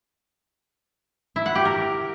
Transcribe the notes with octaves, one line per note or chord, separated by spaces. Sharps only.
E4
F#5
G4
A#4